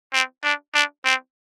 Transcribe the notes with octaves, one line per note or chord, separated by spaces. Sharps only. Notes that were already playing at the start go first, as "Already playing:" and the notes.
C4
D4
D4
C4